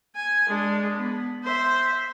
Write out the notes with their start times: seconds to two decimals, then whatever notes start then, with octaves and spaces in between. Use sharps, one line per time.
0.16 G#5
0.49 G#3 D4
0.97 B3
1.44 C5 E5